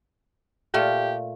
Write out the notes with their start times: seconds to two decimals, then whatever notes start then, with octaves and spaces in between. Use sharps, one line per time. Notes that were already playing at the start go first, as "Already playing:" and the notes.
0.74 A#2 A3 F4 G4